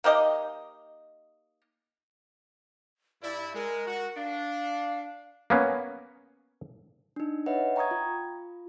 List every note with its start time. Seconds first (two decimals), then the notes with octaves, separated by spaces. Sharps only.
0.04 A#3 D#4 G4 D#5
3.23 G2 E4 D5
3.54 G#3 A#4
3.87 F#4
4.16 D4 F5
5.50 A#3 B3 C#4
7.16 D4 D#4
7.46 B4 C#5 D#5 E5 F#5
7.76 G5 A#5 C#6 D#6 G#6
7.91 F4